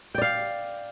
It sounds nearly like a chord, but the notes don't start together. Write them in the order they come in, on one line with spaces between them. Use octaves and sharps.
G5 D5 F5